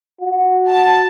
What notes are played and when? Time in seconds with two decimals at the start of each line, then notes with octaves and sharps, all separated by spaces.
0.21 F#4
0.69 A5